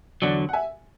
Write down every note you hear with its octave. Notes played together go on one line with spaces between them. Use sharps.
E2 D3 F#3 D5 F#5
F#5
E5 G#5